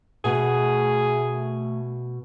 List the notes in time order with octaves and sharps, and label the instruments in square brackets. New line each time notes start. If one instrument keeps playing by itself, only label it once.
[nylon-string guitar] B2 [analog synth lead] A3 [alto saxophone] G#4